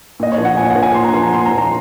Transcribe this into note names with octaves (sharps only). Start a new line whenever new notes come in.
A#2 D#5
C#5
F3
F#5
A#2 G#5
F#5
F3
G#5
A#2 C6
A#5
F3 C6
A#5
A#2 C6
A#5
F3
A#5